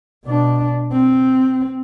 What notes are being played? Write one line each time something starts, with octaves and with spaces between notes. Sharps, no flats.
B2 D4
C4